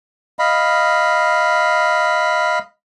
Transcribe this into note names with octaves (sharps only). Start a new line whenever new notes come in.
D#5 F5 B5